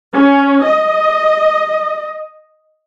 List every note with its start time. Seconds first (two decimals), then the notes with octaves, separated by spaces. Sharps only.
0.13 C#4
0.63 D#5